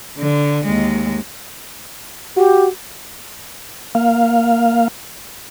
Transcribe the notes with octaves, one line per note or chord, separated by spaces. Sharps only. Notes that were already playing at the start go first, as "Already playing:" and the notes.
D3
D#2 G#3
F#4 G4
A#3 F5